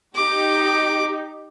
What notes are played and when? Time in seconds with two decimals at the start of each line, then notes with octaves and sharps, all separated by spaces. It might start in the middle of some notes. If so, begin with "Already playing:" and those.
0.15 D#4 G4 D6